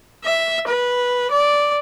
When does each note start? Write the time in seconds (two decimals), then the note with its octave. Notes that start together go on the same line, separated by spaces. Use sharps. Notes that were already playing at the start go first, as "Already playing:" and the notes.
0.25 E5
0.68 B4
1.31 D5